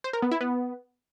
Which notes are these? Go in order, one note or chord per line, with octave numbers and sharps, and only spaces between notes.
C5
A#4
B3
E4
B3